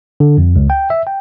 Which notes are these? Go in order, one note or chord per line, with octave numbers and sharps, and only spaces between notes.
D3
F2
C#2
G5
E5
G5